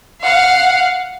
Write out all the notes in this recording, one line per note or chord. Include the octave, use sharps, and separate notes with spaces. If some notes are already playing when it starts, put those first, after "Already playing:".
F5 F#5